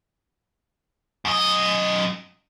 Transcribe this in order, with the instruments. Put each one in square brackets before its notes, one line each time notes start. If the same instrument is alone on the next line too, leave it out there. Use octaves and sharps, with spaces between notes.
[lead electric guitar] F#2 D#5